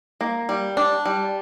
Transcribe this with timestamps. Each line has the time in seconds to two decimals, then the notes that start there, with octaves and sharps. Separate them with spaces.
0.21 A#3
0.49 G3
0.77 D4
1.05 G3